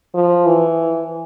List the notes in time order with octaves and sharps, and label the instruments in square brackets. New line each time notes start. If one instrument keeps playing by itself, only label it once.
[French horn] F3
E3